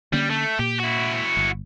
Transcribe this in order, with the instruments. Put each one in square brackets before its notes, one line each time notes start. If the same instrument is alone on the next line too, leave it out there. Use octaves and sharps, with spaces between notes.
[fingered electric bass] D3 A#3 C#4 [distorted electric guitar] G3
[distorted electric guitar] A3
[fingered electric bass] A#2 [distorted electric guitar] G4
[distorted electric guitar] E4 F#4
[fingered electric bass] G1